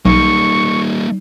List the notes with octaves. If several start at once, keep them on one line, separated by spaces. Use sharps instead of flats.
B1 G3 A#3 D#4 C#6